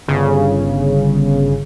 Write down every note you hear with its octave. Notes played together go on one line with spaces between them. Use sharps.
G1 C#3